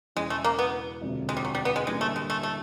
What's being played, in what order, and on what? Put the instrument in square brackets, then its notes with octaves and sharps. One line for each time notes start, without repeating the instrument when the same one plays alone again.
[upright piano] E1 E2 C#3 [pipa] G#3
[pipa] A3
A#3
B3
[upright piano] E1 D2 C3 F3
[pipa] G#3
G3
F#3
G3
B3
G#3
[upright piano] A1 G2 D3 G3 A#3 [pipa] G#3
[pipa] A3
G#3
A3
A3